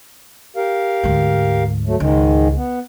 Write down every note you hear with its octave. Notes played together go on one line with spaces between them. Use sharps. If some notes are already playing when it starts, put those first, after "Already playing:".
G4 A#4 F5
D2 G#2
F#3 A3
C#2 G#2 D#3 G#3
B3